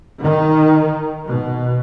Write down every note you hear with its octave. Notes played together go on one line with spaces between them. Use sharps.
D#3
B2